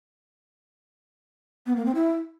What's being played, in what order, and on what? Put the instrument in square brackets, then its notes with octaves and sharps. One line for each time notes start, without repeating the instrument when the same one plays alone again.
[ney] B3
A#3
C4
E4